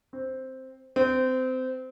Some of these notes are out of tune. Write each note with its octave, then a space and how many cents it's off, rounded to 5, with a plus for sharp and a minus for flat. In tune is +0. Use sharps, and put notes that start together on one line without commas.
C4 +0
C4 -25